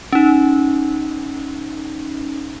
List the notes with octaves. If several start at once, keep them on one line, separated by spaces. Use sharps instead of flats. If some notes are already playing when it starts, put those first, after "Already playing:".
C#4 D#4